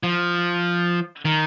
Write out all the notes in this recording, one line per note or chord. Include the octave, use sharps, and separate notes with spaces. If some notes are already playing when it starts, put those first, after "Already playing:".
F3
D#3